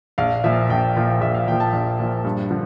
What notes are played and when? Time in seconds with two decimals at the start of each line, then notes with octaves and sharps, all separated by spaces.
0.18 A#1 F5
0.44 A#2 F3 E5
0.70 A#1 G5
0.96 A#2 F3
1.21 A#1 E5
1.34 F5
1.47 A#2 F3 G5
1.60 A5
1.73 A#1
1.99 A#2 F3
2.24 G2
2.51 D3 F3